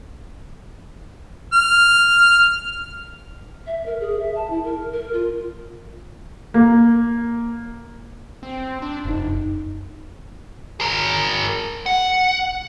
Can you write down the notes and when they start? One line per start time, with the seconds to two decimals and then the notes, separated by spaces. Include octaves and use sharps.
1.53 F6
3.66 E5
3.86 A#4
4.00 G#4
4.19 E5
4.35 A5
4.50 E4
4.64 A#4
4.92 A#4
5.13 F4
6.54 A#3
8.43 C4
8.82 D4
9.05 F1 F#2 D#4
10.80 G#4 A#4
11.86 F#5